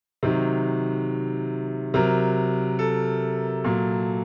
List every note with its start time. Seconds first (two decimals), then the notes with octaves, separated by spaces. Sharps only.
0.23 C3 D#3 F#3
1.94 C3 F#3 A#4
2.79 A4
3.64 A#2 F#3